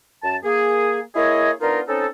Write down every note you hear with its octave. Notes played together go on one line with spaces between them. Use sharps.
F#2 A5
A#3 G#4
A#3 E4 G#4 C#5 D#5
B3 D4 D#4 F4 A#4
C4 C#4 D#4 A4